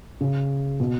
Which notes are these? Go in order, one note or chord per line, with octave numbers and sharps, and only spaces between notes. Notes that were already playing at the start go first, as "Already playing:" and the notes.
C#3
B2